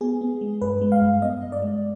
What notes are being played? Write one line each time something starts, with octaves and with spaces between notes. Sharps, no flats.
B3 G#4
B3
G#3
G2 B4
G#3
F5
G2
B3 D#5
G2
D5
G#3